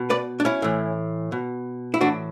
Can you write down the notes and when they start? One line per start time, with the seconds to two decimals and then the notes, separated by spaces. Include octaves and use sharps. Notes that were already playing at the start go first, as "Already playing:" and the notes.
Already playing: B2
0.10 B4 D5
0.40 D4
0.45 C#4 E4
0.62 A2 E3
1.32 B2
1.94 E4
2.01 A2 E3 D4 F#4